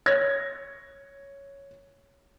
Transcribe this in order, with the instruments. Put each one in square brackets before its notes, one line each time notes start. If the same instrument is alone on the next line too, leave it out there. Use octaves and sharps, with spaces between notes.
[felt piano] C#5 G#6 A#6